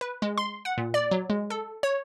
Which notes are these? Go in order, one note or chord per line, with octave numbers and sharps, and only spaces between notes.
B4
G#3
C6
F#5
A#2
D5
F#3
G#3
A4
C#5